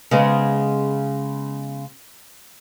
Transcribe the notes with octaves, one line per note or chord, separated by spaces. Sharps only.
C#3 G#3 B3